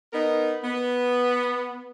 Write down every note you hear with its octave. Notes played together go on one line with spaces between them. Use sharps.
B3 D#4 A#4
B3